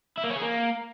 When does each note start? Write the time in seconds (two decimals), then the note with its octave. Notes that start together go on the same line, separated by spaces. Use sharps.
0.18 E4
0.24 A#3
0.30 C#4
0.36 G#4
0.42 A#3